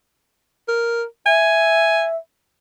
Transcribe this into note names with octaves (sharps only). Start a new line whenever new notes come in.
A#4
E5 G#5